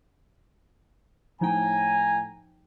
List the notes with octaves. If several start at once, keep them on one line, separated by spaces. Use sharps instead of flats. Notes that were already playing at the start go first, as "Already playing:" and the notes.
A2 F3 D#4 G5 G#5 A#5